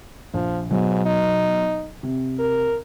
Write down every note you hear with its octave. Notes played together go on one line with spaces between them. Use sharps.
A#1 F3
G#2 B2 F#3
D#4
C3
A#4